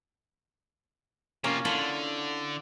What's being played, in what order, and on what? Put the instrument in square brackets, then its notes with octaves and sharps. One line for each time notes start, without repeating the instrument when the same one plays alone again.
[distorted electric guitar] C3 F4 [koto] A#3 C#4
[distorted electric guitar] D3 [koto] E4 F4 A4